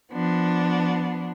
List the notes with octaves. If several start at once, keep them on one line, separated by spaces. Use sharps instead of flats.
F3 B3 D4